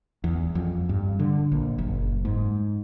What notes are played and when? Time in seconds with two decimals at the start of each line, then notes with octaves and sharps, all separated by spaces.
0.24 E2
0.55 F2
0.89 G2
1.19 D3
1.52 A#1
1.78 F#1
2.25 G#2